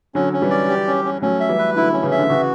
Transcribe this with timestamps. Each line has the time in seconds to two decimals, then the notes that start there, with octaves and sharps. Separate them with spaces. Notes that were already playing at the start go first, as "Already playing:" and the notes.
0.15 D3 F#3 C#4
0.33 C#4
0.42 E3 G3
0.50 D5
0.69 G4
0.87 C#4
1.05 C#4
1.22 F#3 A3 C#4
1.40 E5
1.49 E3 G3
1.58 B4
1.76 D3 F#3 E4
1.93 C#4
2.03 C#3 E3
2.11 E5
2.19 D3
2.29 C#3 E3 F#4